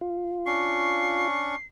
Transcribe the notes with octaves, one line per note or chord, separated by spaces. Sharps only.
F4
C#4 D4 C#6 C7